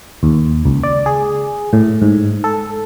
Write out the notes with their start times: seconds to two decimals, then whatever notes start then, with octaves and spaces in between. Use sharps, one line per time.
0.23 D#2
0.65 C#2
0.83 D5
1.06 G#4
1.73 A2
2.02 G#2
2.44 A4